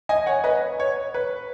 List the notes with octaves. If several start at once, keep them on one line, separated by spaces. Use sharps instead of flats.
D#5 G#5
C#5 F#5
B4 D#5
C#5
B4